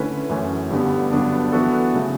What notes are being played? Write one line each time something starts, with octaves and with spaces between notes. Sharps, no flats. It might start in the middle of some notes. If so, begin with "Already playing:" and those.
Already playing: D3 A3 C#4 E4 B4
F#2 E3 A3 C#4
G2 D3 G3 B3
G2 D3 F#3 B3 D4
E3 B3 D4 F#4 A4
C#3 F#3 A3